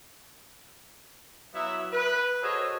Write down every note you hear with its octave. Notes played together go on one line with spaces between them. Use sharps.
F#3 B3 E4 E5
B4
F#4 G#4 A4 C5 C#5 D#5